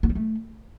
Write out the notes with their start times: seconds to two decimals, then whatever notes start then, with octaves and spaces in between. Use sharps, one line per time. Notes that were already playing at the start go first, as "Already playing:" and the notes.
0.03 B3
0.09 G3
0.15 A3